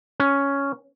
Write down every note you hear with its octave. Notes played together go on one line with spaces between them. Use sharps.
C#4